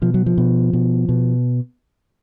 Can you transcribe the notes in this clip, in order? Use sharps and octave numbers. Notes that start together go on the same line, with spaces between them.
B2 F3
F#3
F3
B2
B2
B2